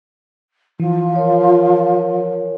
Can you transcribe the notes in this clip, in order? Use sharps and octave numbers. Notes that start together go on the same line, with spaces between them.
E3 F3
F4 A#4 C#5